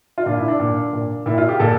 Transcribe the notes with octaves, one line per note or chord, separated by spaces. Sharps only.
F4
A#2 D4
E4
D4
A#2
A#2
A#2 E4
F4
G4
A#2 A4